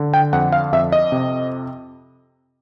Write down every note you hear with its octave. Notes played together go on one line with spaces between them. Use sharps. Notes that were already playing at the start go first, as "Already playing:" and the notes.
Already playing: D3
G5
F2 F#5
F5
F2 E5
D#5
C3